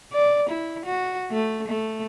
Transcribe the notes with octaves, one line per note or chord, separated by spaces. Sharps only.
D5
E4
F#4
A3
A3